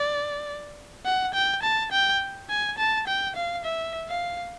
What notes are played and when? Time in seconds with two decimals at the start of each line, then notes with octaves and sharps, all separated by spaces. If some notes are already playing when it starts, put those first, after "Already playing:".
Already playing: D5
1.06 F#5
1.34 G5
1.63 A5
1.92 G5
2.50 G#5
2.78 A5
3.07 G5
3.36 F5
3.65 E5
4.09 F5